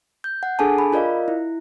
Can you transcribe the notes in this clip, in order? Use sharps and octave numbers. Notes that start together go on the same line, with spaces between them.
G6
F#5
D4 G#4 A4 G#5 A5
B5
F4 A#4 D5 D#5 F5
E4